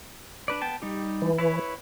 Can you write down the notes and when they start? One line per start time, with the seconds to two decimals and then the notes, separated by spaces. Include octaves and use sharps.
0.48 D4 B4 D5
0.62 B3 G5 A5
0.82 G3 D#4 G4
1.22 E3
1.38 E4 B4 C#5